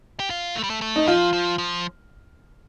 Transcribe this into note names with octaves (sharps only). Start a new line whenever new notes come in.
G4
F4
A3
G3
A3
A3
D#4
F3 F4
F3
F3